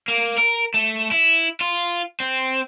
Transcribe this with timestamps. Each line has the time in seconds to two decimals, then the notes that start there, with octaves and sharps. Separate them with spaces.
0.08 A#3
0.38 A#4
0.74 A3
1.11 E4
1.61 F4
2.20 C4